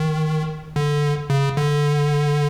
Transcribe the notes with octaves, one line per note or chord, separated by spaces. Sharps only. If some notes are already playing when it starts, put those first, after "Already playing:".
Already playing: D#3
D3
C#3
D3